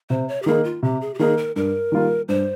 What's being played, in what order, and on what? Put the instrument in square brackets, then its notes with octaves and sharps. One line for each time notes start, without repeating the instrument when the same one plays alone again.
[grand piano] C3 [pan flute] C5
[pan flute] C#5
G4
[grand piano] D#3 A#3 D#4 [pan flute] G#4
[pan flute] F4
[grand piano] C3 [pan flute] G4
[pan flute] G#4
G4
[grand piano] D#3 A#3 D#4 [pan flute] G#4
[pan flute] A#4
[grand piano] G2 [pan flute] A#4
[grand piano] D#3 G3 A#3 F4
[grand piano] G2 [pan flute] C5